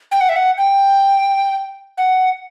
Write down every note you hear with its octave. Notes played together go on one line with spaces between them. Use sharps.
G5
F#5
E5
F#5
G5
F#5